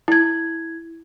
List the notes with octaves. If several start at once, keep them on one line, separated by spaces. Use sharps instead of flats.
E4 G#6